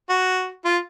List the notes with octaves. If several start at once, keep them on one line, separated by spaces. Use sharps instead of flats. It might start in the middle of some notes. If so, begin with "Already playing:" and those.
F#4
F4